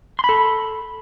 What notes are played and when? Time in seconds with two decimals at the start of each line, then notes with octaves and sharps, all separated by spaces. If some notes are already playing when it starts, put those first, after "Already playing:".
0.19 C6
0.24 B5
0.29 A4